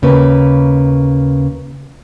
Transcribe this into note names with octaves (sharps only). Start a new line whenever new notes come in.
D#2 C#3 A#3 B4